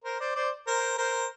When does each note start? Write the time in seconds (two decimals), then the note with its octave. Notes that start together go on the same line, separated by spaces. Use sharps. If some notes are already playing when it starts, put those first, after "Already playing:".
0.04 A#4 C5
0.20 C5 D5
0.35 C5 D5
0.67 A#4 C5
0.98 A#4 C5